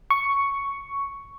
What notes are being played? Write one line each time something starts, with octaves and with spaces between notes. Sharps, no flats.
C#6